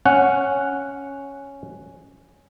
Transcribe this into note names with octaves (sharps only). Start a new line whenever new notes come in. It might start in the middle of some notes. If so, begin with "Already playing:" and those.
C#4 F#5